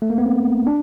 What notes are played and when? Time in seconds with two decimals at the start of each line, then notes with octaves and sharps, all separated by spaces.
0.02 A3
0.10 A#3
0.18 B3
0.26 C4
0.67 D4